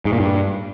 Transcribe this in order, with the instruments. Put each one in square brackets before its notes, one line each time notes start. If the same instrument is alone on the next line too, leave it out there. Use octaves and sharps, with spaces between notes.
[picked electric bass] G#2
A#2
G2